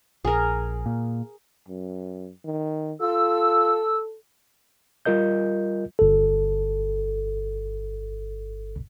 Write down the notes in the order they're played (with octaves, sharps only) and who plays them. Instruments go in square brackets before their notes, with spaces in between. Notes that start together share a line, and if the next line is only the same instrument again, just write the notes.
[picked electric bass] A#1 [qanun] G#4 A#4
[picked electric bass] A#2
[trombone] F#2
D#3
[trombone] F4 [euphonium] A4 [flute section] E6
[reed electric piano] G3 F4 A#4 D#5 G6
[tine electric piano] G1 A4